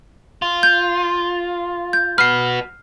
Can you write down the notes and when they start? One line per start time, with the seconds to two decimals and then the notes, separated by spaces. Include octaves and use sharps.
0.42 F4
0.63 G6
1.93 G6
2.18 F#4 B4 F6 C7